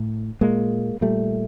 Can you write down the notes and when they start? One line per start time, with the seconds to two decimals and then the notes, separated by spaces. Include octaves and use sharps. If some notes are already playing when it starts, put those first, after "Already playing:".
Already playing: A2
0.41 A#2 G#3 A#3
1.01 A#2 G3 A3